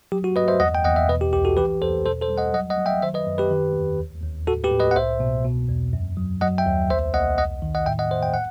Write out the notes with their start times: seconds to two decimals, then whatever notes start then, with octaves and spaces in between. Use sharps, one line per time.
0.12 F#3 G4
0.24 F#4
0.36 G2 B4 D#5
0.48 C5 E5
0.60 E2 D#5 F#5
0.75 G5
0.84 E2 D#5 F#5
0.96 E5
1.08 B2 B4 D#5
1.21 G4
1.33 C2 G4
1.45 F#4 A4
1.57 E3 G4 B4
1.82 E2 A4 C5
2.06 B2 A4 C5
2.21 A4 C5
2.30 G3
2.38 D#5 F#5
2.54 F#3 D#5 F#5
2.70 D#5 F#5
2.78 F#3
2.86 E5 G5
3.02 D#3 C5 E5
3.14 B4 D#5
3.27 F#2
3.38 G4 B4
3.51 D#3
3.75 E2
3.99 D#2
4.23 D#2
4.47 A2 F#4 A4
4.64 G4 B4
4.71 A2
4.79 B4 D#5
4.91 F#5
4.96 C2 C5 E5
5.20 B2
5.45 B2
5.69 E2
5.93 F#2
6.17 F#3
6.41 F#3 D#5 F#5
6.58 E5 G5
6.66 D#2
6.89 C2 C5 E5
7.14 C2 D#5 F#5
7.38 E2 D#5 F#5
7.62 D#3
7.75 D#5 F#5
7.86 A2 E5 G5
7.99 D#5 F#5
8.11 A2 C5 E5
8.23 G5
8.34 F#5